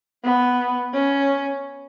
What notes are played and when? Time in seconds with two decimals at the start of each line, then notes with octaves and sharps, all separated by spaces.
0.24 B3
0.93 C#4